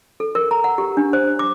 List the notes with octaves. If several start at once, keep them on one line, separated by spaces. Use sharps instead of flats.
A4
A#4
A#5
F#5
G4
D4
C5
D6